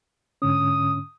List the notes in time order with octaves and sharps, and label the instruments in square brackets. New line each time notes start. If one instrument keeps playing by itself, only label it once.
[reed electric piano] G#2 D3 C#4 [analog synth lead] D#6